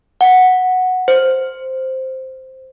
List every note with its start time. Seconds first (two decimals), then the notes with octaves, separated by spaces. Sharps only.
0.21 F#5
1.08 C5